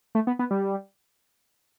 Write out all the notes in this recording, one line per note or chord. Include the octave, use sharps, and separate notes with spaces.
A3
B3
B3
G3